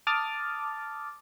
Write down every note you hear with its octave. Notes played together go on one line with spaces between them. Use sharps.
A5 D6 D#6 F6 A6